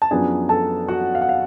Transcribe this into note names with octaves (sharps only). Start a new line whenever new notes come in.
A5
F#2 F3 B3 D4 G#4 G#5
A4 A5
F#4 F#5
F5
F#5
F5